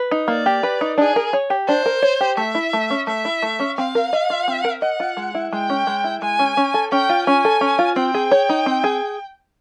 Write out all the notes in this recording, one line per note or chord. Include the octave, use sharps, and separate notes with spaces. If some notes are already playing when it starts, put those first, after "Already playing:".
Already playing: B4
D#4
A#3 D5
G4
B4
D#4
D4 G#4
A#4
C#5
G4
D4 C5
A#4
C#5
G4
A3 E5
E4
A3
C#4
A3 E5
E4
A3
C#4
C4 F5
A#4
D#5
F4
C4
A#4
D#5 F#5
F4
G#3
E4
G#3 G5
C#4
G#3
E4
G#3 G#5
C#4
C#4
A4
C#4 G5
F4
C#4 G#5
A4
C#4
F4
C4 G5
G#4
C#5
D#4
C4
G#4